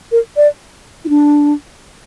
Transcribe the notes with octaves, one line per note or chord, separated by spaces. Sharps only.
A#4
D5
E4
D4